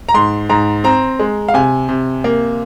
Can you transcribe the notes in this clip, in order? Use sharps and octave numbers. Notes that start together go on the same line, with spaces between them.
A#5
G#2 C6
G#2 A#5
C4 A#5
G#3
F5
C3 G#5
C3
A#3